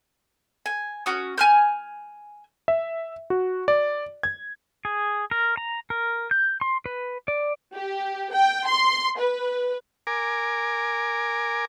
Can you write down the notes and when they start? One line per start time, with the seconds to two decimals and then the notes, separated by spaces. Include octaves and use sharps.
0.66 G#5
1.06 C#4 F#4 D#6
1.38 G#5 F6 G6
2.68 E5
3.30 F#4
3.68 D5
4.23 G#6
4.85 G#4
5.31 A#4
5.57 A#5
5.90 A#4
6.31 G6
6.61 C6
6.86 B4
7.28 D5
7.74 G4
8.33 G5
8.67 C6
9.19 B4
10.07 A#4 G#5 D6